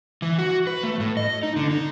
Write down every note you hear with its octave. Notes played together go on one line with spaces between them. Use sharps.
E3
F#4
B4
A3
A2
D#5
D#4
D3
D#4